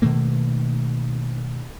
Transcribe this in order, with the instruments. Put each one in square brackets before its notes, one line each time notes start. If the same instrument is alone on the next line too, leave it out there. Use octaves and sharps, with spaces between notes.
[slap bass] B2 D#3 A3 A#3